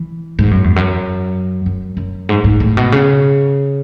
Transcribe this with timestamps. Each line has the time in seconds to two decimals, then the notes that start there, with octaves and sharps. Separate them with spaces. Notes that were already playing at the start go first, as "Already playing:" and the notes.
Already playing: E3
0.39 G#2
0.51 F#2
0.64 E2
0.76 F#2
1.66 F#2
1.97 F#2
2.29 G#2
2.44 G#2
2.60 A2
2.77 B2
2.92 C#3